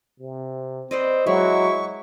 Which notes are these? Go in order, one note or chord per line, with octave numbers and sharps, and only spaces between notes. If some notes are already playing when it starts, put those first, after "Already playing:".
C3
C4 B4 D5 D#5
F#3 G#3 E4 C#6